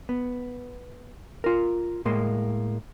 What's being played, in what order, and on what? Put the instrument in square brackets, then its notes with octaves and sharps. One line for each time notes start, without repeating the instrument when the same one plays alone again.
[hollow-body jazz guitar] B3
F4 A#4
A2 G#3 A#3 C6